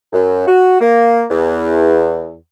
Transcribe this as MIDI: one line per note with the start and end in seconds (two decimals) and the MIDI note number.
0.13 0.45 42
0.47 0.81 66
0.81 1.24 58
1.30 2.35 40